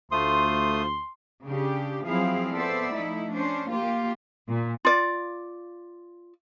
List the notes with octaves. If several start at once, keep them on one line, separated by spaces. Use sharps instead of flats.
D2 A3 F4 C5 C6 D#6
C#3 D4 G4
F3 F#3 C4 E4 G#4 F5
B3 A4 C5 D5 E5
F3 A3 D#4 E4
C#4 D4 C5
A#3 F4 G4
A#2
F4 D5